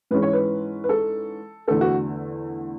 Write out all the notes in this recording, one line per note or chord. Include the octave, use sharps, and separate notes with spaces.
G#2 E3 G#3 C#4 B4
C#5
B4
B4
A4
E2 D3 A3 A4
F#4